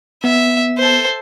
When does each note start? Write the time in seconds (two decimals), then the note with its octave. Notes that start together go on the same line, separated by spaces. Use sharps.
0.24 B3 E5
0.78 A4 C5